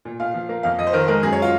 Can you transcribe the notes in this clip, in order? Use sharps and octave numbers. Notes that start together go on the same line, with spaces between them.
A#2
A#2 F5
F3
A#3
F2 F5
F2 D#5
C5
D#3 A#4
G#3 A#4
F#2 G#4
C#5
F4